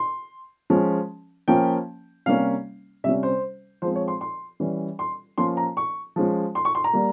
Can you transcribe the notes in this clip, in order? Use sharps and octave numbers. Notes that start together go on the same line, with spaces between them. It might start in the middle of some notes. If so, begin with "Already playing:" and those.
Already playing: C6
F3 G#3 C#4
F3 A#3 C#4 G5
C3 G3 A#3 C#4 F5
C3 G3 C#4 E5
C5
F3 G#3 C4 C5
C#5
C6
C6
E3 G3 C#4
C6
F3 A#3 C#4 C6
A#5
C#6
F3 G#3 C#4
C6
C#6
C6
A#5
G3 A#3